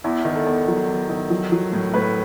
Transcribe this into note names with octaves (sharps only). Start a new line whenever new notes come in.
E2 E4
D#3
A4
E2
F#3
E2
D#3
F#3
F#3
A2
A2 B4